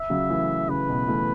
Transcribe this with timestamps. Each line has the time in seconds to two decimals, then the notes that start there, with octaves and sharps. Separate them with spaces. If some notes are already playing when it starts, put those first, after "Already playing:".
Already playing: E5
0.10 C#3 F#3
0.29 E3 A3
0.69 C#3 B4
0.89 B2
1.08 E3 A3